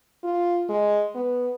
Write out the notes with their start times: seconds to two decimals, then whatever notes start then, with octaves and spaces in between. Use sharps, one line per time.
0.24 F4
0.69 G#3
1.15 B3